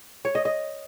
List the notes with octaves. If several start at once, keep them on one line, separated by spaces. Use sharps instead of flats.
C#5
D#5
D#5